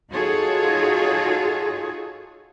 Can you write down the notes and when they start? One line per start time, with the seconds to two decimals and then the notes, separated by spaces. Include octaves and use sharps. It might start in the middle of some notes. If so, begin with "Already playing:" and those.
0.11 D#4 F4 F#4 G#4 A4 C#5